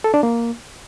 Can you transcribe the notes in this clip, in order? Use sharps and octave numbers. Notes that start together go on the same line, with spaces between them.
A4
D4
A#3